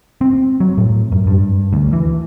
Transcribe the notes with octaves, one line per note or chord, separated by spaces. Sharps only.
C4
F#3
A2
F#2
G2
D2
E3